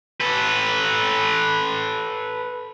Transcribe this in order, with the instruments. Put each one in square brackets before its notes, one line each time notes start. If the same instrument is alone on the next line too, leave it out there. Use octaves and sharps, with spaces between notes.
[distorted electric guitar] A4 B4